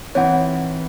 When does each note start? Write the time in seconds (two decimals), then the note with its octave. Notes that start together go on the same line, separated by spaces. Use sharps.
0.15 E3 C4 D#4 C#5 F#5